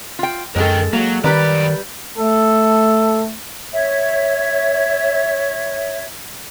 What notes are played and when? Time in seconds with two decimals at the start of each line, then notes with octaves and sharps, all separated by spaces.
0.19 F4 G5
0.56 F#2 G#3 A4 A#4 G5
0.93 F#3 A#3
1.24 F#2 D#3 G3 B4 D5 A#5
2.18 A3 A4
3.73 C#5 E5